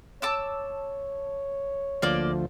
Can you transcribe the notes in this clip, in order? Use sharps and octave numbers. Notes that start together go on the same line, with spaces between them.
C#5 A5 D6 E6
D2 F3 A#3 D5